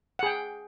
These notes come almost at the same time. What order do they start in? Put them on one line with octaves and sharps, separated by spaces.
F#5 G#4 G5